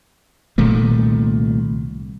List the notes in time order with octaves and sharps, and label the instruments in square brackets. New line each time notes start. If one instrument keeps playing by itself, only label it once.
[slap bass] C2 A#2 D#3 A3